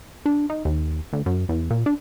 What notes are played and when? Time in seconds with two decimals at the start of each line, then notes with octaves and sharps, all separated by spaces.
0.26 D4
0.50 D#4
0.65 D#2
1.13 D2
1.26 F#2
1.49 E2
1.70 A#2
1.86 D4